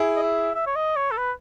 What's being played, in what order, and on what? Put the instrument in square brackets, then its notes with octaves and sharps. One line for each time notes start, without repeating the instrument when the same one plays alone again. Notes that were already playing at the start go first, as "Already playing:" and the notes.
Already playing: [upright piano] E4 G#4
[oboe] D#5
E5
E5
C#5
D#5
C#5
A4
B4